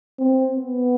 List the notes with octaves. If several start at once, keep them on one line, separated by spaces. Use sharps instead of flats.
C4
B3